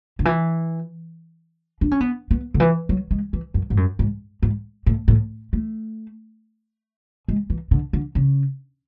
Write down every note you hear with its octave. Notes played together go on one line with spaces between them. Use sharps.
D3
E3
D4
C#4
B3
B3
D3
E3
F#3
G#3
E3
F#2
G#2
F#2
G#2
G#2
A2
A2
A3
G#3
E3
D3
D3
C#3